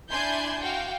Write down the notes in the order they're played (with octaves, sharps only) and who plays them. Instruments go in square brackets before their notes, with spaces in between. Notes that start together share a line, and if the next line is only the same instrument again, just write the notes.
[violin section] D4 E4 G#5 C6 G6
F#4 F5 G5